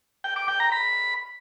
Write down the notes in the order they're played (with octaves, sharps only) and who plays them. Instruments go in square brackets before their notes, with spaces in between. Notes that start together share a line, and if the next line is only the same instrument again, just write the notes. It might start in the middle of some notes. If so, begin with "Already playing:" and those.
[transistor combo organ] G5
D6
G5
A#5
B5